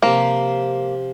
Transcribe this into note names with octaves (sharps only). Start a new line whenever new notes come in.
C3 F3 A#3